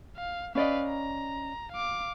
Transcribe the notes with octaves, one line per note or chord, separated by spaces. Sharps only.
F5
C#4 B4 D5 D#5 F5
A#5
F5 D6